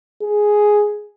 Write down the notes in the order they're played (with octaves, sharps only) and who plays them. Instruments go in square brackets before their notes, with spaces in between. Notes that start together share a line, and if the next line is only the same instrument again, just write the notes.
[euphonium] G#4